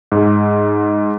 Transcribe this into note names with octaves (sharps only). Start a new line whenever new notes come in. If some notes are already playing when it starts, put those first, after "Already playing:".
G#2